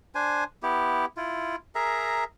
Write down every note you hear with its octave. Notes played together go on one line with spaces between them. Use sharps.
D4 C5 G#5
B3 E4 G4
E4 F4
G#4 A#4 E5 A#5